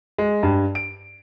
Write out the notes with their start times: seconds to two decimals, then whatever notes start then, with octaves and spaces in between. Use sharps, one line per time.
0.18 G#3
0.43 G2
0.75 D7